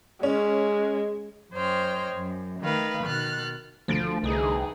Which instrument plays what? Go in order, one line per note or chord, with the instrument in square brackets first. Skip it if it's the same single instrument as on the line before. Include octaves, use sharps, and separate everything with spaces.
[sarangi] G#3 [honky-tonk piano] C#4
[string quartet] F#2 C5 C#5 D#5 G5 F6
F#2
D#3 A3 B4 F5
B2 D#3 F6 F#6 A6
[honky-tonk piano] D2 A6 D7 [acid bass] F3
[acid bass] C2 [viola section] E3 D#4 G#4